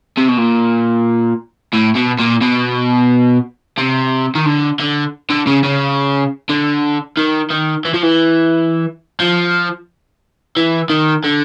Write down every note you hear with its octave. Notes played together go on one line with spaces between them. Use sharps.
C3
B2
A#2
A2
B2
A#2
B2
C3
D#3
D3
D3
D3
C#3
C#3
D3
D#3
D#3
E3
F3
E3
F3
E3
D#3
D3